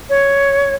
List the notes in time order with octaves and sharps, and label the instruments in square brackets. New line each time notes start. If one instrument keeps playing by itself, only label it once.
[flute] C#5